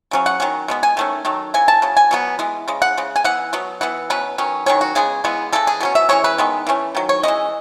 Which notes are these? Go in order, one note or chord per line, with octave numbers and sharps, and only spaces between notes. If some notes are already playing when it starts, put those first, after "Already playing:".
C#3 F#3 C#4
F#5
D#3 F#3 C#4
B2 G#3 B3
G#5
D#3 A3 C#4
D#3 F#3 A3
C#3 E3 G#5
A5
C#3 F#3
G#5
B2 F#3 B3
E3 G#3 B3
C#3 G#3
F#5
C#3 G#3
G#5
E3 B3 F#5
B2 F#3 B3
E3 B3 F#5
B2 F#3 C#4 B4
D#3 F#3 C#4
D#3 F#3 C#4 C#5
F#4
C#3 G#3 B3 G#4
C#3 E3 G#3 B3
C#3 E3 G#3 A4
G#4
B2 F#3 C#4
E5
E3 G#3 C#4 C#5
B4
D#3 G#3 B3
E3 A3 C#4
D#3 F#3
C#5
E3 G#3 C#4 D#5